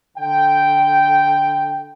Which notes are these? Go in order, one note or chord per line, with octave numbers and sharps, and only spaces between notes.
D3 G5